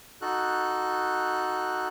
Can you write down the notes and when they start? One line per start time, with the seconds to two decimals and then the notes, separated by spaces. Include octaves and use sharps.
0.21 D#4 F#4 A4 F#6